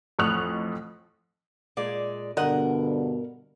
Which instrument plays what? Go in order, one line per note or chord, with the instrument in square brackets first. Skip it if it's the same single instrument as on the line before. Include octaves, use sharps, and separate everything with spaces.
[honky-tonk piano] A1 F2 C#6 D#6 F#6 F7
[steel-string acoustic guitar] A#2 G#3 D5
[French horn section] G2 B2 D3 [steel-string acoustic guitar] A#4 [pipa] D#5 F#5